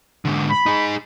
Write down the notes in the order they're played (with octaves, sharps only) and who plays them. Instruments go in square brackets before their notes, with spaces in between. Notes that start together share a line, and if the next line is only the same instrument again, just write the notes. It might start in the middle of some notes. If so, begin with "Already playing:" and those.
[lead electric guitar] G#2 D3
[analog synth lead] B5
[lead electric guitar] D#4 G#4